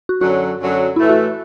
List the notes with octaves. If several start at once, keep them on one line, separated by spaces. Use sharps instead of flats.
F#4
F#2 D3 F#3 F#4
F#2 D3 F#3
A2 E3 A3 E4
F#4